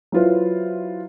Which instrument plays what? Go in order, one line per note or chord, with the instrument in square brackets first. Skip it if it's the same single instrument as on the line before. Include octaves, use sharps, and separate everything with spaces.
[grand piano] F#3 E4 F4 B4 C5